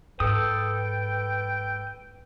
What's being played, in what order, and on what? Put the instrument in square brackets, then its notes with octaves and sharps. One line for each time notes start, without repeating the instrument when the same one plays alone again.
[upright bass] G#2 [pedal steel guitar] A4 D#6 [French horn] B4 [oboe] G5